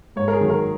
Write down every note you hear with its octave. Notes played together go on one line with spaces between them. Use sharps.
G#2 C#5
A#4
G#4
D#3 F#3
A#4